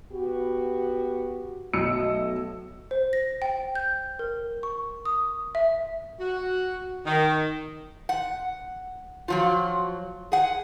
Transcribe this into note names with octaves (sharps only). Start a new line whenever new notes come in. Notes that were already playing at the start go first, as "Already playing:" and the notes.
B3 F#4 G4
B1 A3 D#5 E6 C#7
C5
A#6
G5
G6
A#4
C#6
D#6
E5
F#4
D#3
F#5
F3 F#3 F4
G#4 F#5